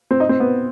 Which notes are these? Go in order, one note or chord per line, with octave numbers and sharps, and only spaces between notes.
C4
D#4
C4
B3